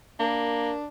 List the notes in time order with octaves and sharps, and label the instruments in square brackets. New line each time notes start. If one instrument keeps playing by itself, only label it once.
[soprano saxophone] A#3 [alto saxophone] D4 [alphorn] A#4